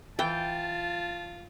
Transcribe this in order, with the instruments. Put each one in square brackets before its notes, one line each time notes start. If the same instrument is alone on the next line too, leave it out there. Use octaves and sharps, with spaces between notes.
[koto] E3 [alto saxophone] F4 [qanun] G5 [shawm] A5